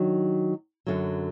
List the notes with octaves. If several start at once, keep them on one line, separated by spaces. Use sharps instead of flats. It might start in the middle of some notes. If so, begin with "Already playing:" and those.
Already playing: D#3 F#3 D4
F#2 D3 F#3